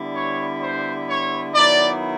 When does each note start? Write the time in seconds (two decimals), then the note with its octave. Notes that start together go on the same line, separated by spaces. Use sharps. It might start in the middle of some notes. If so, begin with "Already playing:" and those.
Already playing: D3 G3 B3 E4
0.13 C#5
0.62 C5
1.08 C#5
1.55 D#3 F#3 B3 E4 D5